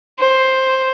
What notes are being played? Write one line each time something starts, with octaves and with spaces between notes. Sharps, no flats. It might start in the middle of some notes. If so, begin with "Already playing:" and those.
C5